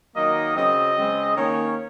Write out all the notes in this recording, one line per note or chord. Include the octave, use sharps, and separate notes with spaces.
D#3 F#3 A#3 D#5
C#3 F#3 C4 D#5
C#3 G#3 C4
D#3 A#3 C#4 C#5